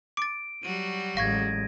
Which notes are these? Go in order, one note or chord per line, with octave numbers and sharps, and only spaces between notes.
D6 A6 D7
F#3 G3 F#4 D#7
A1 G#3 F5 C#6 G#6 A#6